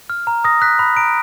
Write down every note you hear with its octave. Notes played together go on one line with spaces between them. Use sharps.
F6
A#5
D#6 A#6
F#6 B6
B5
A#5 D7